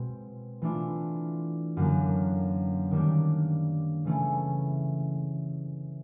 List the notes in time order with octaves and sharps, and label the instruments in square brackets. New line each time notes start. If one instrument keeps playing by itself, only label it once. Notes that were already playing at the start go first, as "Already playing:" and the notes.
Already playing: [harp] B2 G#3 C4
E3 A3 D4 F4
F#2 D3 F#3 A#3
D#3 G3 A#3 D4
C#3 E3 A3 C#4